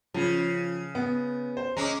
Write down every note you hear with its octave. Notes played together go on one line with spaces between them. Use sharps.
C#3 F3
B3
C5
G#3 C#4 A#5 D6